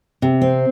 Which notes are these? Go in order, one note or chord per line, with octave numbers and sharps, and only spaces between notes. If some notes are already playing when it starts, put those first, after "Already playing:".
C3
C4